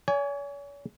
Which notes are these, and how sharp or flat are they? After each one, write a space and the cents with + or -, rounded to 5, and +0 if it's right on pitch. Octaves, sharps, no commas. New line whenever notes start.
C#5 +40 G#5 +0